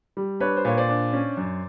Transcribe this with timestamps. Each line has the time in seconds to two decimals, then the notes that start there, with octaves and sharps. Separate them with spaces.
0.17 G3
0.40 D4 B4 C#5
0.57 C5
0.65 A#2 C#5
0.77 C5 D5
0.89 D4
1.13 C#4
1.37 F#2